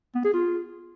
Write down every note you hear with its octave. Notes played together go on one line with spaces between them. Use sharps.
B3
G#4
F4